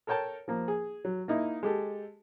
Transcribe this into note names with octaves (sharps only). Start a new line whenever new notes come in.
A4 A#4 C#5 G5 A5
F3 A#3
G#4
F#3
A#3 D#4 E4
G#3 G4 A4